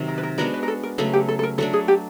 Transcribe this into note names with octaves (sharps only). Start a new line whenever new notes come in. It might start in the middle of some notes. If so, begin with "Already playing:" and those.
Already playing: C3 D#3 F#3
A#4
B4
A#4
G#3 B3 D4 F#4 A#4
B4
A#4
A4
A#4
C#3 F#3 A3 A4
G4
A4
A4
A#4
F#3 A3 D4 A4
G#4
G4